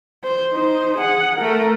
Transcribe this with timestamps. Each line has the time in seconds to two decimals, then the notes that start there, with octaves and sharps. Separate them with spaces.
0.24 C5
0.53 D#4 C5
0.97 G#4 F#5
1.38 A3 A#4